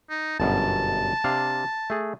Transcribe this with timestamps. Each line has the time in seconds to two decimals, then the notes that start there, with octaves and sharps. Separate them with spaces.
0.10 D#4
0.40 G1 F#2 B2 A5
1.24 C3 D4 F5
1.90 A3 G#4